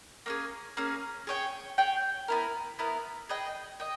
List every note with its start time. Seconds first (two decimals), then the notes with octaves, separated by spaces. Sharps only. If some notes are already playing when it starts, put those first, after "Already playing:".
0.26 A#3 C#4 G#4
0.77 A#3 C#4 G#4
1.27 G#4 C#5 G5
1.78 G#4 C#5 G5
2.28 B3 E4 A#4
2.79 B3 E4 A#4
3.29 G#4 B4 D#5 G5
3.80 D#5 G5